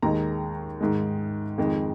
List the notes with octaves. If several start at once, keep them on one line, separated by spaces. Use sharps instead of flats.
D#2 D#3 G#3 A#5
G#2 D#3 G#3
F2 D#3 G#3